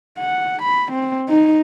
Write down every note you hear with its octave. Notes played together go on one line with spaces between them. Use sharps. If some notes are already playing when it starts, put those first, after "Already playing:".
F#5
B5
C4
D#4